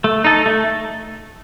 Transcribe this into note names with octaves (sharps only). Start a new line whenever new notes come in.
A3
D#4 A4
A3